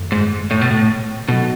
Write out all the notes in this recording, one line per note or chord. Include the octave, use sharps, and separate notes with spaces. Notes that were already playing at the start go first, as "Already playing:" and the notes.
Already playing: F#2 D#3 A3
G#2
A2
B2
A2
B2 F#3 B3 D#4 F#4 A4